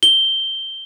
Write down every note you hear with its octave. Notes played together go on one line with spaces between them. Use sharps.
G7